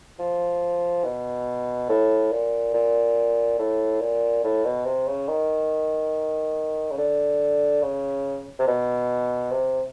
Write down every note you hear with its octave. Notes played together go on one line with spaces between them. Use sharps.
F3
B2
A2
A#2
A#2
A2
A#2
A2
B2
C3
C#3
D#3
C#3
D3
C#3
C3
B2
C3